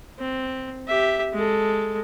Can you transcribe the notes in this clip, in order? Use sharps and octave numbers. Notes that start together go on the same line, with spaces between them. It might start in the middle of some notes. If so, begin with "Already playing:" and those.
C4
G4 E5
G#3 A4